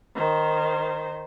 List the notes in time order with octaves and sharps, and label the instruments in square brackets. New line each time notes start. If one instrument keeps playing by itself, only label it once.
[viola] D#3 C5